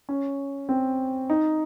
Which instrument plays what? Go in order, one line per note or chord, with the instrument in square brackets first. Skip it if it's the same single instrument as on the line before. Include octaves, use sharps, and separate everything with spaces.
[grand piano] C#4
C4
D#4